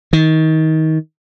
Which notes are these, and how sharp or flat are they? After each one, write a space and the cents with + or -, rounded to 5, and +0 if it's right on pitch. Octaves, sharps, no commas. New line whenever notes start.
D#3 +25